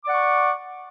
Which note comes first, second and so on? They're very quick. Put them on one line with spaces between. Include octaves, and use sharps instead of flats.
D6 D5 F#5 C#6